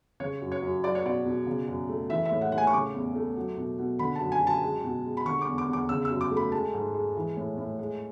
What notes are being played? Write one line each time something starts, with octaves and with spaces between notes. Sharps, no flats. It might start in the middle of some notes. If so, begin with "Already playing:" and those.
C#3 C#5
F#2
C#5
F#2
F#3 D5
C#5
B2 D5
B2
C#3
F#2
A3
E3 E5
E5
A2
F#5
A2 F#5
G#5
C#6
C#3 D6
E2
A3
F#3
B2
B2
D3 B5
F#2 A5
G#5
F#2
A5
G#3
B2
G#3
B5
D3 C#6
D6
E2
D6
E2
D6
C#3 E6
E6
F#2
D6
A3
B5
G#3 A5
G#2
G#3
E3
A2
A2
G#3